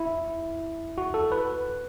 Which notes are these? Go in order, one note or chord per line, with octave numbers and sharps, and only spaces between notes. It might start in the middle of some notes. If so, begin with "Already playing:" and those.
Already playing: E4
F#4
A4
B4